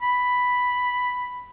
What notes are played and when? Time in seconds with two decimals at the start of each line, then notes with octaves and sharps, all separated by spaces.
0.02 B5